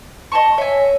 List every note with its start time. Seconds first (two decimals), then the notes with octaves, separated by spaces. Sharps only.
0.32 D#5 A5 C#6
0.58 C#5 E5 G#5